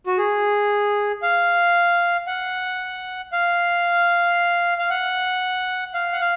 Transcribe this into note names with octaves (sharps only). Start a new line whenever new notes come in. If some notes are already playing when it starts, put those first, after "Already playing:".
F#4
G#4
F5
F#5
F5
F5
F#5
F5
F#5
F5